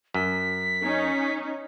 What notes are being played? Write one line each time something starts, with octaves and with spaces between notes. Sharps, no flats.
F#2 B6
C#4 D#4